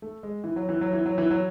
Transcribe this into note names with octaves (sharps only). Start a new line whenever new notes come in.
A3
G#3
E3
F#3
E3
F#3
E3
F#3
E3
F#3